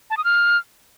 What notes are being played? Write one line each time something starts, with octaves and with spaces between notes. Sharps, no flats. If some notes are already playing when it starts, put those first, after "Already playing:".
A5
D#6
F6